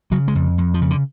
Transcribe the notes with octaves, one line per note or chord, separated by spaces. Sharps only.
C#3 F#3
G#3
F2
F2
F3
C#3
D3